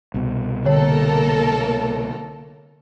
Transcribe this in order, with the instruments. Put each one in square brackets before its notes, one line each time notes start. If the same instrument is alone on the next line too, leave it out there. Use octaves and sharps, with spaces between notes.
[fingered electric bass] C2 B2
[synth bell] D3 C#5 [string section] A#3 A4 A#4